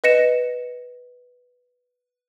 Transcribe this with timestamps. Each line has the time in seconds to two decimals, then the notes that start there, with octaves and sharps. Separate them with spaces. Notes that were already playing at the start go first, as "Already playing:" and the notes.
0.04 B4 D#5 A#6 C#7 E7